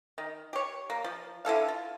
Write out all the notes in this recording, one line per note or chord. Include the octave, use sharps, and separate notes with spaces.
D#3
G4 C#5
A#3
F3
D3 E4 A4 F5
F4